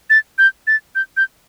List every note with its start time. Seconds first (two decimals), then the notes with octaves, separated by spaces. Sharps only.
0.10 A6
0.38 G6
0.67 A6
0.95 G6
1.17 G6